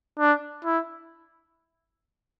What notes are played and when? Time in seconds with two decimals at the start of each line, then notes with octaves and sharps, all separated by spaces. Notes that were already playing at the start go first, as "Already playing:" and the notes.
0.19 D4
0.65 E4